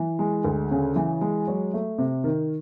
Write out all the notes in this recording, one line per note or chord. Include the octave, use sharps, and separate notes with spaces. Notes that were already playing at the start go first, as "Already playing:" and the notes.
Already playing: E3
G#3
D2
C#3
E3
G#3
F#3
A3
C3
D#3